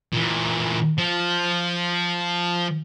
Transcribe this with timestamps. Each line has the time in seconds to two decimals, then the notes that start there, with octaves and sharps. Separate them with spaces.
0.13 A#2 E3
0.99 F3